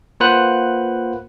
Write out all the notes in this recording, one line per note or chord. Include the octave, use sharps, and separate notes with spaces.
A#3 F4 B4 C5 F#5 F#6